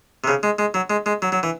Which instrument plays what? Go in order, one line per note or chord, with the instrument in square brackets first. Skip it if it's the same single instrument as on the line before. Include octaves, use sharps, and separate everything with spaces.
[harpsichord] C3
C#3
G#3
G#3
F#3
G#3
G#3
F#3
F#3
E3